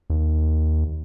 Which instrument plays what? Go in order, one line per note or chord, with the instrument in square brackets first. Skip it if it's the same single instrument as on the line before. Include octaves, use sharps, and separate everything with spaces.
[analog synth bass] D#2